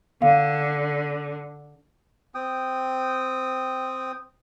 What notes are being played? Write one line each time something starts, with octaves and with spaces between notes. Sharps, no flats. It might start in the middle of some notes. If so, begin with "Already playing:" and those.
D3 F5
C4 G5 D#6